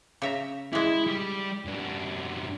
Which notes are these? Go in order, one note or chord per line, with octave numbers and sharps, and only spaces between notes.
C#3 E5 A#5
E3 G#3 E4
G3 G4
F#2 D4